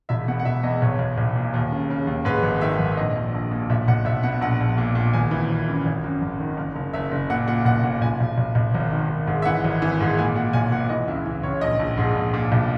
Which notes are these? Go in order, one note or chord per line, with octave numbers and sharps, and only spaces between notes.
E1 E5
B2 F#5
F#5
E1 E5
E2 D#5
B1 C#5
B1
B1
A#2
D#2
C#3
C#3
D#2
G#2 B4
G#1
D#3 E5
G#1
E5
A#1 D#5
A#1
A#1
A#2
B1 E5
B1 F#5
B1 E5
B2 F#5
A#1 F#5
A#1
A#2
A#2
G#1 G#5
E3
G#1
F#2
G#1
F#2
G#1
D#3
F#1
F#1
F#1 E5
F#1
A#2 F#5
A#2 F#5
B1 F#5
A#2 F#5
B1 G#5
B1
B1
B1
G#1
D#3
G#1
G#2
E5
E3 F#5
G#1
E3
G#2
A#2 G#5
A#2 F#5
B1 G#5
A#2 F#5
E3 D#5
C#2 E4
E3
C#2 C#5
A#1 D#5
A#1
G#2
A#1
A#2
B1